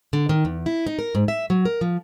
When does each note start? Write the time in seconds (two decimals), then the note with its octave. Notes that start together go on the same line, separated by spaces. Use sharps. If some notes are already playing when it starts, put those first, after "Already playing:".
0.13 D3
0.29 D#3
0.45 E2
0.66 E4
0.86 D#4
0.99 A#4
1.15 G#2
1.28 E5
1.50 F#3
1.65 A#4
1.81 F3